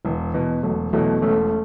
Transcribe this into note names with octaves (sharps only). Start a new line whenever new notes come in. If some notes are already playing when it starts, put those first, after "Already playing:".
E1 E3
E2 B2
E1 F#3 A3
E2 B2 F#3 A3
E1 A3 C#4